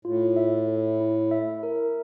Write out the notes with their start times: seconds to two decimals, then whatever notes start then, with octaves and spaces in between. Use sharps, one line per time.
0.05 A2 F4
0.36 E5
0.68 A4
1.00 E4
1.31 E5
1.63 A#4